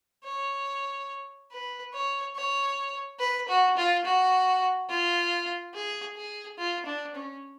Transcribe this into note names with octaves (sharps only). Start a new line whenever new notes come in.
C#5
B4
C#5
C#5
B4
F#4
F4
F#4
F4
G#4
G#4
F4
D4
C#4